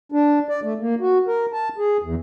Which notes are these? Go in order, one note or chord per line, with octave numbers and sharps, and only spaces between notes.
D4
D5
A3
A#3
F#4
A#4
A5
G#4
E2